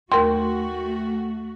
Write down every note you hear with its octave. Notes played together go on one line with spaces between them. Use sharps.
D#2 A3 F#4 A#4 G5 C6